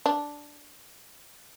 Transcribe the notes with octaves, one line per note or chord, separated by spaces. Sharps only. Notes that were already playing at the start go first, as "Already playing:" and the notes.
D4